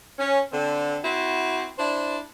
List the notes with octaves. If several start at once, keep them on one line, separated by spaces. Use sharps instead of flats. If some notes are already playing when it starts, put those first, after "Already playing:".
C#4
D3 C4
C4 E4 F#4
D4 E4 C5 D5